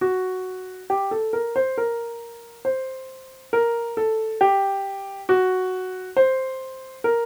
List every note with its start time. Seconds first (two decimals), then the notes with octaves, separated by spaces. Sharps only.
0.01 F#4
0.90 G4
1.11 A4
1.33 A#4
1.56 C5
1.78 A#4
2.65 C5
3.53 A#4
3.97 A4
4.41 G4
5.29 F#4
6.17 C5
7.04 A#4